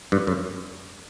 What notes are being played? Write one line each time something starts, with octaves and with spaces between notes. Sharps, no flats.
G2
F#2